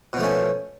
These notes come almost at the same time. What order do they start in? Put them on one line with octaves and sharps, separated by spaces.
B2 F3 A3 C#4